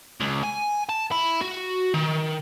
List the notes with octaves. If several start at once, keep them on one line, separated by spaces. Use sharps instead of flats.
C#2
G#5
A5
E4
F#4
D#3